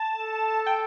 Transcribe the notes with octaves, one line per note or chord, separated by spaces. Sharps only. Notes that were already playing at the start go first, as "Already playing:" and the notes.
Already playing: A5
A4
G5